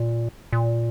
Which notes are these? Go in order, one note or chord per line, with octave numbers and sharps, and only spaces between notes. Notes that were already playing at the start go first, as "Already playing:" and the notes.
Already playing: A#2
A#2